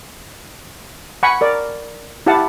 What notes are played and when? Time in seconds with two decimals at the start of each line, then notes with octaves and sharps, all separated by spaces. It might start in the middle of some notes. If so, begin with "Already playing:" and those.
1.23 F#5 G#5 B5 C#6
1.41 A#4 D5
2.26 E4 G4 F5 F#5 A5